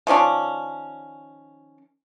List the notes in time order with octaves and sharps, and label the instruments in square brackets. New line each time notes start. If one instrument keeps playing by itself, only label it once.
[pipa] D#3 F3 C#4 D4